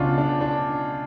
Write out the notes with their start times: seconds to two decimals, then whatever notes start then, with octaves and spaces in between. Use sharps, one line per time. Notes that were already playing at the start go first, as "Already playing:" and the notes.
Already playing: C#2 B2 C#4 D4 F4
0.18 D4
0.41 D4